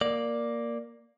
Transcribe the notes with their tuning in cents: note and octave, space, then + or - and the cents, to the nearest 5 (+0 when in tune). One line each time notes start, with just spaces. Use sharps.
A#3 +0 D5 +0